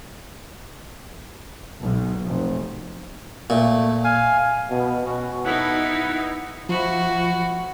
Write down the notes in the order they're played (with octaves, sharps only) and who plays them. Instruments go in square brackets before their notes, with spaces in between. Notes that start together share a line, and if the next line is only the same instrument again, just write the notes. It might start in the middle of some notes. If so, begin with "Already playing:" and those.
[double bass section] B1
F1
[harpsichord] A#2 [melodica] A3
[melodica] F5 G#5
[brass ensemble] B2
[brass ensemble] B2 [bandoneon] C#4 F#4
[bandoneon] B3 F#5 [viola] D#4 E4
[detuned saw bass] F3 [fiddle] E4 F#4